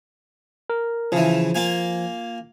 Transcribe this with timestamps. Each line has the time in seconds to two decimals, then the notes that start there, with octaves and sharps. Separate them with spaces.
0.70 A#4
1.12 C#3 E3 F3
1.55 A#3 F4 G#5